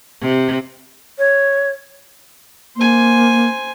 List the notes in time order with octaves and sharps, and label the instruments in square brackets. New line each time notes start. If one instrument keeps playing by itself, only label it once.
[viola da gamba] C3
[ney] C#5
[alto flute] A#3 [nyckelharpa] C5 G#5